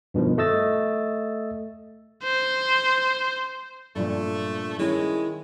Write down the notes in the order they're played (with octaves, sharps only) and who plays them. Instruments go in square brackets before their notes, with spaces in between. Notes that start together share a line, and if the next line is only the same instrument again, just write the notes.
[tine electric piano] G2 B2 D#3 F3
A3 D#5 E6 A6
[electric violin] C5
[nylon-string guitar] G2 A#2 F3 [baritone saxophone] A3
[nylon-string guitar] D#3 C#4 E4 [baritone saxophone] G#3